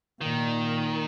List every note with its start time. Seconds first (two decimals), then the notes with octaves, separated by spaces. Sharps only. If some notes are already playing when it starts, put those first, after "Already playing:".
0.21 A#2 D#3